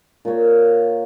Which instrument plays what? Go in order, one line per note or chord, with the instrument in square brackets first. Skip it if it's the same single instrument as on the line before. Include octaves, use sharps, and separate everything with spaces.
[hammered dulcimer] A#2 C#5